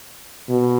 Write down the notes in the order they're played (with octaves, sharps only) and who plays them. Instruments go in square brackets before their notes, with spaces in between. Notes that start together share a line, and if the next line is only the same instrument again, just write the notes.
[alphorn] B2